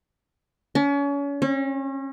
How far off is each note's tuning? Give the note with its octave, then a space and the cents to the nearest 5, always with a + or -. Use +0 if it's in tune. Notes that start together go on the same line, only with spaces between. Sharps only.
C#4 +35
C#4 -35